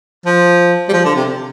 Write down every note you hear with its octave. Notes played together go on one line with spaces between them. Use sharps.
F3
G3
F3
D3
C3